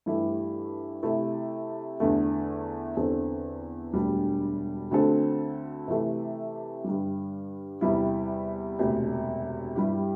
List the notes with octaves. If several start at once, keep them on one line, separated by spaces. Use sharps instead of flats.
G2 E3 A3 E4 G4
C3 A3 E4
E2 D3 A3
E2 D3 C4 A4
E1 D2 D3 G3 D4
D2 D3 C4 A4
C3 E3 A3
G2 D3 G3
E2 C3 G3 E4
E1 D2 C3
G2 G3 E4 G4